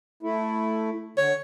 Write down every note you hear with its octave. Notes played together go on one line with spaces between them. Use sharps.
A3 E4
D3 C#5